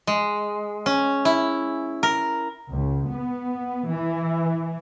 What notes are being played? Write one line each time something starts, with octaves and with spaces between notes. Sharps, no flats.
G#3
C#4
E4
A#4
C#2
B3
E3